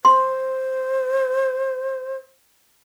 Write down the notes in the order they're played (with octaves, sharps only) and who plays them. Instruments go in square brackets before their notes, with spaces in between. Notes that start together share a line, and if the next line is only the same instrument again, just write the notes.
[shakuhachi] C5 [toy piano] C6